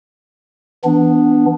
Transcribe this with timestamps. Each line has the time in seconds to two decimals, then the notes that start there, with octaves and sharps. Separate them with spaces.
0.84 E3 B3 D4